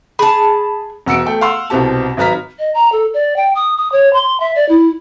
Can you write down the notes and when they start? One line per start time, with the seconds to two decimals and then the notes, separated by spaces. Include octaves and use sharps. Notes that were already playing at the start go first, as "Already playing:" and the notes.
0.19 G#4 A5 B5
1.06 E1 F#4 E6 C#7 D7
1.26 A3 A4 G5
1.41 F5 F#5 C6 E6
1.70 C2 B2 C4 G4 A5
2.17 G#1 F#3 B4 A#5 F6 B6
2.58 D#5
2.74 A#5
2.92 A4
3.13 D5
3.36 G5
3.55 D#6
3.77 D#6
3.92 C#5
4.13 C6
4.40 E5
4.55 D5
4.68 E4